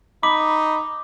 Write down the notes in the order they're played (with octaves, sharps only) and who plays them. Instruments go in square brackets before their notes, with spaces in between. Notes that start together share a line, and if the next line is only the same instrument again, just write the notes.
[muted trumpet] D#4 [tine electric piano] B5 [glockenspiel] D6